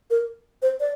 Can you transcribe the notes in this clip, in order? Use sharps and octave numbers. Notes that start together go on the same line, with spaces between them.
A#4
C5
D5